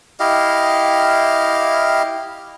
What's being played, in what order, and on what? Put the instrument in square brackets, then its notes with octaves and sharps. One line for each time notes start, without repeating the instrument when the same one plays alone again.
[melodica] E4 G4 D#5 F5